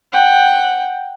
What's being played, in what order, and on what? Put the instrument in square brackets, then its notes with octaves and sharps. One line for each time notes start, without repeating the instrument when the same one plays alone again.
[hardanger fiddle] F#5 G5